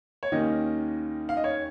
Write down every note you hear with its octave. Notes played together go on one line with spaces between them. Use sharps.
C#5
D#2 D#3 A#3 C#4 D#5
F5
D#5
C#5